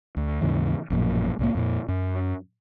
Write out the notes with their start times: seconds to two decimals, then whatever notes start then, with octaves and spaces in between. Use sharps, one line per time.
0.17 D2
0.41 D#2 G#2 C#3 E3
0.90 A1 F#2 A#2 F3
1.39 C2 A2 A#3
1.55 F2 A#2
1.88 F#2